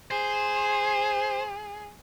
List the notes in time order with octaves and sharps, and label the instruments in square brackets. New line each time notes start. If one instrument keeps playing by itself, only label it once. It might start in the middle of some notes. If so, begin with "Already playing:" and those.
[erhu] G#4 [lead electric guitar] C5